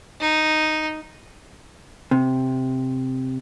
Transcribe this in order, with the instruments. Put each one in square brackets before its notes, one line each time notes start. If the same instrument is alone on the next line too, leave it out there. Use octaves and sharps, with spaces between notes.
[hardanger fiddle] D#4
[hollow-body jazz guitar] C3